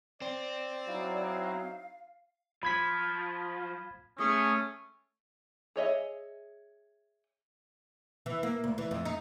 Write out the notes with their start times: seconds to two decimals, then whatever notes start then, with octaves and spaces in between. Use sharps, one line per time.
0.22 C4 D5
0.87 F#3 D#4 E4 F5
2.63 F3 B5 G#6 B6
4.19 A3 C#4 G#4
5.76 G#4 C#5 D#5 E5
8.26 E3
8.43 A#3
8.64 D2
8.78 E3
8.91 F2
9.05 D#4